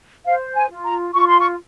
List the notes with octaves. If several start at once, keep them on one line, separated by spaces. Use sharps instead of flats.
C5 F5
G#5
F4
A#5
F4 C#6
C6
C#6